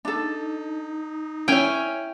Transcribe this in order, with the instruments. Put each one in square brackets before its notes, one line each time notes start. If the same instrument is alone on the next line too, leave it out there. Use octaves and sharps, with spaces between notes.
[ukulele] D4 A4 [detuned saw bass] D#4
[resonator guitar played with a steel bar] C#4 [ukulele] E4 C#5 [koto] G5 G#5